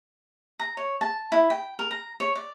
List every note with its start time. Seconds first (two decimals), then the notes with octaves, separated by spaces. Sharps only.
0.59 A#5
0.77 C#5
1.01 A5
1.32 E4
1.50 G5
1.79 A#4
1.91 A#5
2.20 C#5
2.35 D5